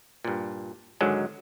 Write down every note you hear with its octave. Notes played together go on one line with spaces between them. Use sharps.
G2 A#2
G#2 D3 D#3 F#3 G#3